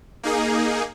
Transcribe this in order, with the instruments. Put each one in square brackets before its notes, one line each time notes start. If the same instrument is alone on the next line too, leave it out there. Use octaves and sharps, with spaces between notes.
[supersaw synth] A#3 D#4 G#4